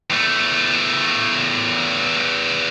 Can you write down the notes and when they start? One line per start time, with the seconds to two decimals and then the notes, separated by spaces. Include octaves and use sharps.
0.10 E2 A3